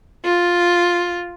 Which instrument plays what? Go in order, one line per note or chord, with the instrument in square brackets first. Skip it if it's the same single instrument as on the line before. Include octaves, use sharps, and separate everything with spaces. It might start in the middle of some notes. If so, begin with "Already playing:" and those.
[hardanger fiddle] F4